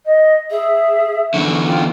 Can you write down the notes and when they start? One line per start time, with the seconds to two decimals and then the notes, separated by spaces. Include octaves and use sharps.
0.06 D#5
0.51 G#4 E5
1.34 E2 D3 C#6
1.66 F4 G5